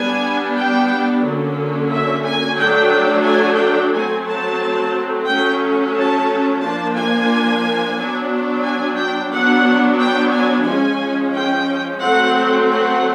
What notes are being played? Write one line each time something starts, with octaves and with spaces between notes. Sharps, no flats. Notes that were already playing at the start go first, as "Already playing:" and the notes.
Already playing: G3 B3 D4 G#5
G5
D3 F#3 A#3 C#4
E5
G#5
F#3 A3 D4 G5
G#5
G5
F#3 A3 C4 G#5
A5
F#3 A3 C#4 G5
A5
F3 A#3 D4 A5
G#5
F#3 B3 D4
G#5
G5
F#3 B3 D4 F#5
G5
G#5
F3 G#3 C#4 G#5
G5
F#3 A3 C4 F#5
F#5